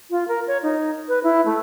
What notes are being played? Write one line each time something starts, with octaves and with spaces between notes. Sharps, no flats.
F4
A#4
C#5
D#4
B4
E4
A3